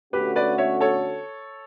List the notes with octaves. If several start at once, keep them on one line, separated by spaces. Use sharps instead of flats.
D3 A3 C#4 F#4 G4 B4
B4 D5
C#5 E5
A4 C#5